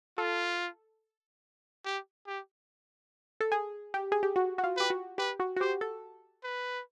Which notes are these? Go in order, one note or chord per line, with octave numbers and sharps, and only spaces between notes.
F4 A4
G4
G4
A4
G#4
G4
G#4
G4
F#4
F#4
F4
G4 B4
F#4
G4 B4
F#4
F#4
G4 C5
A4
B4